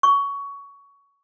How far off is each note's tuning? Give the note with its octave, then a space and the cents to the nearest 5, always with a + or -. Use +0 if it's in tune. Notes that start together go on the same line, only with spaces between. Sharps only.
C#6 +15